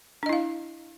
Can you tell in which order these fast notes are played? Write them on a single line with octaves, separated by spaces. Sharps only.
D4 D#5 E4 F5